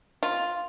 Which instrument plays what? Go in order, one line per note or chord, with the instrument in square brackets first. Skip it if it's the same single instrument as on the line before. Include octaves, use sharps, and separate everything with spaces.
[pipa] F4